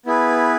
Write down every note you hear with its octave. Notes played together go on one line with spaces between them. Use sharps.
B3 E4 G#4 B4